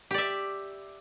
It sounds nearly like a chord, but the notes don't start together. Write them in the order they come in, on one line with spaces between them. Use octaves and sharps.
G4 D5 E5